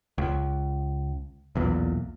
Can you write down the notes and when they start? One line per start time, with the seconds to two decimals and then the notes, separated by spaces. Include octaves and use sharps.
0.18 C#2
1.55 B1 E2 A#2